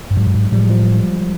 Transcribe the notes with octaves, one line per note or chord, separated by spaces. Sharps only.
G2
G#2 F#3 G#3
G2
G#2
A2 F3 G3
F3 G3